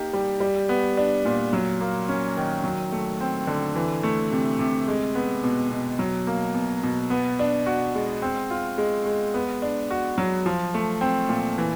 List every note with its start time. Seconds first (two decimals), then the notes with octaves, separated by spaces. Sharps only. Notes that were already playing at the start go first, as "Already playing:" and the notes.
Already playing: A#3 D#4 G4
0.13 G3
0.40 G3
0.69 B3
0.97 D4
1.25 A#2
1.53 F#3
1.81 A#3
2.09 C#4
2.37 D#3
2.64 F#3
2.92 A3
3.21 C4
3.47 D3
3.76 E3
4.03 A3
4.32 C3
4.59 C3
4.88 G#3
5.15 B3
5.44 B2
5.71 B2
5.99 F#3
6.27 A#3
6.54 B2
6.83 B2
7.10 B3
7.39 D4
7.66 F#4
7.95 G#3
8.22 C4
8.51 F4
8.78 G#3
9.06 G#3
9.34 B3
9.62 D4
9.91 F#4
10.18 F#3
10.46 F3
10.74 A3
11.01 C4
11.29 A#2
11.58 E3